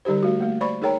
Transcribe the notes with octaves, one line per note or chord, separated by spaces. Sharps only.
D3 G3 D#4 G4 C5
A3 F#4
A3 A#3
C5 D5 B5 C#6
D#4 G#4 A#4 C#5 G5 A#5